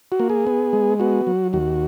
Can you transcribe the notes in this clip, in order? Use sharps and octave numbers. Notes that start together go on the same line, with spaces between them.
F#4
A#3
G#4
B3
G#3
B3 F#4
F#3
D#2 F#4